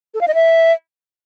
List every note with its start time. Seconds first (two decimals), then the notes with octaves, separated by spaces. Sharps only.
0.14 A4
0.21 F5
0.28 D#5
0.35 E5